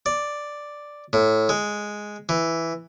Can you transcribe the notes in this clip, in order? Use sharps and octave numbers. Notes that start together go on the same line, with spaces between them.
D5
A2
G#3
E3